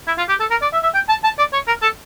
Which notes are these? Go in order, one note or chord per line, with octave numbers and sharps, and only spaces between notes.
E4
F4
G4
A4
A#4
D5
E5
E5
G5
A5
A5
D5
C#5
A#4
A4